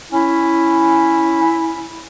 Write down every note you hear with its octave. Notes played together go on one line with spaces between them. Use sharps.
C#4 E4